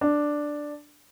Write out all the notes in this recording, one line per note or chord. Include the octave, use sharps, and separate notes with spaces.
D4